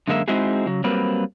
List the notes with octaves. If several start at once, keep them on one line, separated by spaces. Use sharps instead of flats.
F#2 D3 G#3 A#3 F#4 E5
G#3 C4 D#4 E4 F#4 G#4
C#3 F#3
F#3 G3 A#3 C4 B4